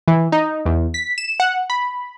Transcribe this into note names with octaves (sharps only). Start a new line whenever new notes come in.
E3
D#4
E2
B6
E7
F#5
B5